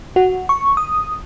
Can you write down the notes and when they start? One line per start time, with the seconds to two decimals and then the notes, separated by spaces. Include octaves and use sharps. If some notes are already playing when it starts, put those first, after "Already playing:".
0.16 F#4
0.49 C#6
0.77 D#6